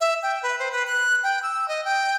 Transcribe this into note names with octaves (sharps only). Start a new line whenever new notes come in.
E5
G5
B4
C5
B4
F#6
G5
E6
D#5
G5